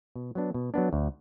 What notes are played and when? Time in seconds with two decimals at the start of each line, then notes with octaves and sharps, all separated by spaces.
0.16 B2
0.35 F#3 B3 D4
0.54 B2
0.74 F#3 B3 D4
0.93 D2